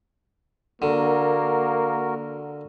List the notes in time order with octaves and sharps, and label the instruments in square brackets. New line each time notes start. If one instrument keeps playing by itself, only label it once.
[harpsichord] D3 [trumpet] A#3 [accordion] F#4 A#4